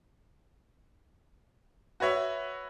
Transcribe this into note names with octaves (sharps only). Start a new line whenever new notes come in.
F#4 B4 C#5 E5